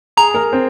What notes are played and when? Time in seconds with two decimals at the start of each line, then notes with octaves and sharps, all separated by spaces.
0.17 G#4 A#5
0.34 A#4
0.52 C4